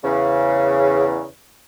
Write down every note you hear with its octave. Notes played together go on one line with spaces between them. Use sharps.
E2 C#3